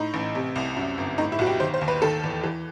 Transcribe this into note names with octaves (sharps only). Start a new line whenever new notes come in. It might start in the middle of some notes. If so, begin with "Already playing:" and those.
Already playing: A2 D#4
A1
C3
C2
F#2
G1
A2 D#4
E4
B1 F#4
G4
D#3 C5
C5
D#2
B4
D#3 A4
E2
E3